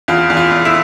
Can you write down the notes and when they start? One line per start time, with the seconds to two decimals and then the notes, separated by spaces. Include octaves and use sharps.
0.08 E2 F4
0.30 E2
0.37 F4
0.51 E2
0.65 E4